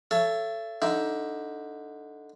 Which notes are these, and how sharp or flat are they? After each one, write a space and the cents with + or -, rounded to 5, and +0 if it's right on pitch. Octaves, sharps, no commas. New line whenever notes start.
A4 +0 C#5 +0 E5 +40
D3 +0 D#4 +15 E5 +0